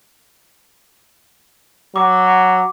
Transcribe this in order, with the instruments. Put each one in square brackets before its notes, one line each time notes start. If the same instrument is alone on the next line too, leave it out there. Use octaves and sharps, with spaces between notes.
[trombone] F#3 [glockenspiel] D6